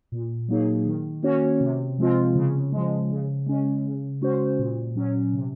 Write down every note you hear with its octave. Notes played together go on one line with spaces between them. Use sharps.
A#2
F#3 A#3 D#4 G#4
D#3
A#3 C#4 F#4 C#5
C3
F3 G#3 C4 F4
C#3
F3 G#3
C#3
G#3 C#4
C#3
G#3 C#4 F#4 C5
A#2
F#3 C#4
C3